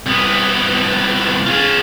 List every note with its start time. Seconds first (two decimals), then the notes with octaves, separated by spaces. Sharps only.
0.06 C2 B3
1.46 F4 G#4